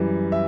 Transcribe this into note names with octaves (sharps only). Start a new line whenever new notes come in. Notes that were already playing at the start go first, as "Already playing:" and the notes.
Already playing: F#2 E3 G3
E5